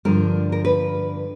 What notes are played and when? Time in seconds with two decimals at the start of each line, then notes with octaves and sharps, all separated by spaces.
0.05 G2 D3 F3 A#4
0.52 A#4
0.65 B4